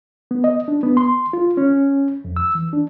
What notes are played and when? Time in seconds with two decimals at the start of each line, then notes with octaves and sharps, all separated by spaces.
0.31 B3
0.44 D#5
0.68 D4
0.83 B3
0.97 C6
1.33 F4
1.57 C#4
2.25 F2
2.36 E6
2.55 E3
2.73 D4